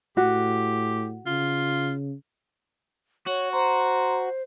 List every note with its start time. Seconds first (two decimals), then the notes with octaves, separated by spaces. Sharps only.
0.17 A2 F#4 G4
1.26 C#3 F4
3.27 F#4 C#5
3.53 C5 A#5 C6